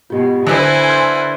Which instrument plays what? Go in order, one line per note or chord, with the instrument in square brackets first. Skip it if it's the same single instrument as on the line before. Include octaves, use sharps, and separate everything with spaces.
[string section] G#2 B2 [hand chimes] F4 G4
[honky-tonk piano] D3 B4 [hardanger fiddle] E4 C5 [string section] G#5 [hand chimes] E6 A#6
[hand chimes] C6 E6 F6